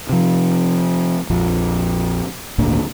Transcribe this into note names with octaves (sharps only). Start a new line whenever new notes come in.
C3 F3
A#1 F2 F3
G#1 D2 A#2 D3